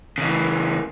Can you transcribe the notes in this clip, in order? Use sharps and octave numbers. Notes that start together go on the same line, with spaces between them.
C#3 E3